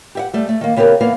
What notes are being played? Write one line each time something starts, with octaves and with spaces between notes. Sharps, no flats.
G4 E5 F#5
G3 A3
A3
D#3 A#3
C#3 B3 G4 A4 A#4
E2 A#3 B3 F5